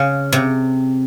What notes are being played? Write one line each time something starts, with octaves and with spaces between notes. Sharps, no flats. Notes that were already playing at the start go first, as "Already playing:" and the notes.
Already playing: C#3
C3